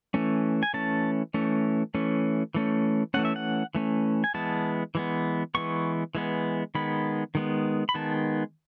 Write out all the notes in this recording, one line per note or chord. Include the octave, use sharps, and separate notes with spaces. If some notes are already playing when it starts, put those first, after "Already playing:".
E3 A3 C#4
G#5
E3 A3 C#4 A5
E3 A3 C#4
E3 A3 C#4
E3 A3 C#4
E3 A3 C#4 F#5
E5
F#5
E3 A3 C#4
G#5
E3 G#3 B3 A5
E3 G#3 B3
E3 G#3 B3 C#6
E3 G#3 B3
D#3 G#3 B3 B5
D#3 G#3 B3
B5
D#3 G#3 B3 A5